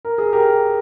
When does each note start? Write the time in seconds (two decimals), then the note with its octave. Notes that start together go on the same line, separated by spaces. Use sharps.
0.05 A#4
0.18 G#4
0.33 G4 A#4